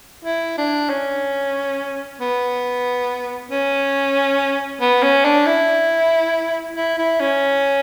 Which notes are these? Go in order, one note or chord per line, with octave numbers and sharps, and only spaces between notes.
E4
D4
C#4
B3
C#4
B3
C#4
D4
E4
E4
E4
C#4